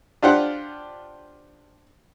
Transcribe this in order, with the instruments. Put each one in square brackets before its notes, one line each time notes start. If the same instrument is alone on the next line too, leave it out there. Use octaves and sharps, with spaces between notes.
[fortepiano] D4 F4 G4 C5 F#5